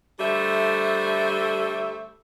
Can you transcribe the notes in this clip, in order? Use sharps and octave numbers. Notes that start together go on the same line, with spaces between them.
D3 G3 A3 C5 E5